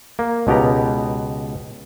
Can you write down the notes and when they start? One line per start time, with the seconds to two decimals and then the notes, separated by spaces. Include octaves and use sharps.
0.19 A#3
0.47 C#2 B2 B3 G4 A#5